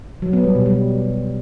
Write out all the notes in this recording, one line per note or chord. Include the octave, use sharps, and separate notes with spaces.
F#3
B3
G3
B2
G3